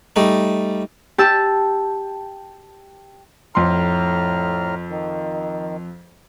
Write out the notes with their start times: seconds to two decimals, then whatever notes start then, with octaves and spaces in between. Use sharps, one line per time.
0.16 G3 A3 D#4
1.18 G4 A5 E6
3.55 F2 A2 A#5 C6 F6
4.89 D#3